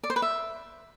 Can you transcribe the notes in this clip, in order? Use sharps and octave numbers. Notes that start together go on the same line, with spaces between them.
D5
C5
B4
E5